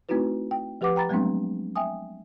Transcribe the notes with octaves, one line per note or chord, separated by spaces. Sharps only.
A3 C4 D#4 E4 F#4 B4
G5
F3 G4 B4 F#5 D6
G5 A#5 B5 A6
F#3 G#3 A3 B3 C4 D4
E5 G5 G#5 D#6